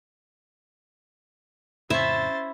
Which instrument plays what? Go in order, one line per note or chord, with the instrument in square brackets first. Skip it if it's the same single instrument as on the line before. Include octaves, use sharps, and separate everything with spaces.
[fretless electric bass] F2 A2 C#3 [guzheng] C#4 E4 [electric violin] C5 A6 [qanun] E5